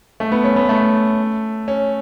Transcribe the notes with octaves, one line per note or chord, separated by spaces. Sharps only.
A3
B3
C#4
B3
A3
C#4